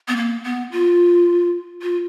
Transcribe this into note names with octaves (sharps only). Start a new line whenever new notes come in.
B3
A#3
B3
F4
F4